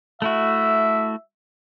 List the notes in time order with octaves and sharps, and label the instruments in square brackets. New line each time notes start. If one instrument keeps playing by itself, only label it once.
[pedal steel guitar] A3 E4 F#4 [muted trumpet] E5